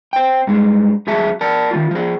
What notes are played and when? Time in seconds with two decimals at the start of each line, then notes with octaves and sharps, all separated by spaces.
0.13 C5 G5
0.47 G2 G#3
1.07 F2 F#3 G#4 E5 A5
1.41 A#4 D5 A5
1.71 D#3 A3 F4
1.91 F3 G#4